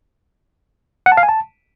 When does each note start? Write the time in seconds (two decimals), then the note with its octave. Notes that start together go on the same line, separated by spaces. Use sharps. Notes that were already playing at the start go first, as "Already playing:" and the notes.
1.06 F#5
1.12 A5
1.17 F5
1.23 G#5
1.29 A5